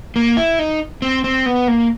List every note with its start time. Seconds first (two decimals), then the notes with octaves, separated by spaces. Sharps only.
0.16 A#3
0.37 E4
0.59 D#4
1.02 C4
1.24 C4
1.46 B3
1.68 A#3